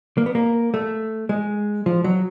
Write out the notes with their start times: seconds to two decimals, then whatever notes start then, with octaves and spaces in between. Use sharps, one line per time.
0.18 A#3
0.26 B3
0.35 A#3
0.74 A3
1.29 G#3
1.86 F3
2.04 F#3